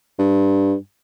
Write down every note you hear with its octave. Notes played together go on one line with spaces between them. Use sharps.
G2